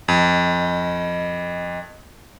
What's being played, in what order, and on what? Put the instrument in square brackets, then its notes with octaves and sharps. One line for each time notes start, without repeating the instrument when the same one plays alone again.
[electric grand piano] F2 [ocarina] D#5